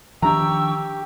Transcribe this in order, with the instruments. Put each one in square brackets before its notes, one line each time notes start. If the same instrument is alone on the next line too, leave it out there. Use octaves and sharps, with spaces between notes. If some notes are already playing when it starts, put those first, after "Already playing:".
[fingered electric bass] D#3 F3 D4 [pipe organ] G4 [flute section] G5 C#6 E6 [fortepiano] A#5